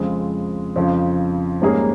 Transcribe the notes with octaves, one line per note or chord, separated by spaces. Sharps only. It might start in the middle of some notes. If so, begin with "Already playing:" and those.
Already playing: F2 C#3 F3 G#3 C4
F2 C#3 F3
G#2 G3 A#3 C#4 G#4